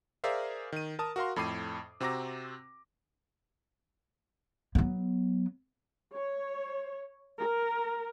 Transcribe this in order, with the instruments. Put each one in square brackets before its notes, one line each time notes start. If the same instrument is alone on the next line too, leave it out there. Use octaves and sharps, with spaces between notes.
[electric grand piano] G#4 A#4 C5 D5 E5 F5
D#3 D#7
A#4 A5 D#6
F#4 A#4 F5 C6
F2 A2 B5 D6 C7 D#7
C3 C4 F#4 A#5 D6 A#6
[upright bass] F#3 B3
[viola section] C#5
A#4